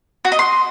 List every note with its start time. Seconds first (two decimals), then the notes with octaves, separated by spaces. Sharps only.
0.25 F#4
0.32 D#5
0.39 C6